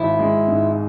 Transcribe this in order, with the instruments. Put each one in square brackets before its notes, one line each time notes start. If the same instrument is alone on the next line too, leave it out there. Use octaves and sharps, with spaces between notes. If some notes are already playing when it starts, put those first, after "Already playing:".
Already playing: [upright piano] G#1 [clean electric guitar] E4
[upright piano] G#3
G#2